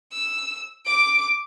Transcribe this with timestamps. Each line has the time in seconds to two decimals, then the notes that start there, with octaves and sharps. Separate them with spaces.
0.12 E6
0.86 D6 D7